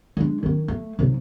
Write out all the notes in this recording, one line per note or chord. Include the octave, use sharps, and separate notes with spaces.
G#3 D4
D#3 C#4
A3
B1 C3